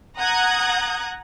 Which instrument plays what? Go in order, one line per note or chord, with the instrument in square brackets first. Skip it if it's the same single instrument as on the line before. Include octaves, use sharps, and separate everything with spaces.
[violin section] F#5 A#5 D#6 F#6 G#6